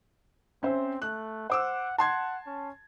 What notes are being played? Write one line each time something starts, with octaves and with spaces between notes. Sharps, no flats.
C4 C#4 C5 E5
A3 F#6
C5 F#5 D6 E6
F#5 A5 C6 G#6
C#4